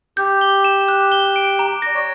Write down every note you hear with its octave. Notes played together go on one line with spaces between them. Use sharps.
G4 G6
G7
E7
F#6
G7
D7
A#5
D5 A#6
C#5